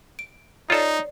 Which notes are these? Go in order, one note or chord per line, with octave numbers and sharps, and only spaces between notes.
D7
D#4 F4 A4 C#5 D5 C7